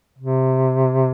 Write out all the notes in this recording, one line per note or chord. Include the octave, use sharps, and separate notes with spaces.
C3